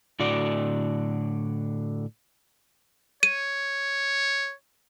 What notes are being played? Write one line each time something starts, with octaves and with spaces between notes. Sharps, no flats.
A2 D3 F#4 D5
C#5 D#7